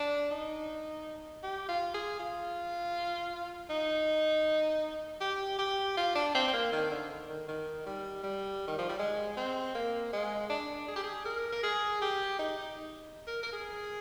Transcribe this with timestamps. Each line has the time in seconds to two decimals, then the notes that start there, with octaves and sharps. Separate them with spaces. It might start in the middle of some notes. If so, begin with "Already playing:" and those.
Already playing: D4
0.31 D#4
1.43 G4
1.69 F4
1.94 G#4
2.19 F4
3.70 D#4
5.21 G4
5.59 G4
5.97 F4
6.15 D4
6.34 C4
6.48 C4
6.53 A#3
6.72 D#3
6.91 D3
7.29 D#3
7.48 D#3
7.86 G3
8.23 G3
8.68 D#3
8.78 F3
8.89 G3
8.99 G#3
9.37 C4
9.75 A#3
10.13 G#3
10.50 D4
10.88 G#4
10.96 G4
11.03 G#4
11.25 A#4
11.52 A#4
11.63 G#4
12.01 G4
12.39 D#4
13.27 A#4
13.43 A#4
13.53 G#4